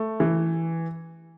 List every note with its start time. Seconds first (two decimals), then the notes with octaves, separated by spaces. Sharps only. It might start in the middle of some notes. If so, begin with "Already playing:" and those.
Already playing: A3
0.20 E3